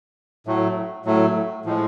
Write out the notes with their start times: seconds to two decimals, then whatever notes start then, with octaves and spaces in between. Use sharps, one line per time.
0.47 A2 F#3 A3
1.05 A2 F#3 A3
1.65 A2 F3 G#3